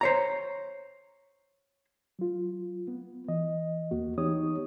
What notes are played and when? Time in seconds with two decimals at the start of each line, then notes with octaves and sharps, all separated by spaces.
0.01 C5 C#5 A#5
2.19 F#3 F4
2.88 B3
3.28 E3 D#5
3.91 D#2 A#3 F#4
4.18 E3 B3 D#4 G4 C#5 D#6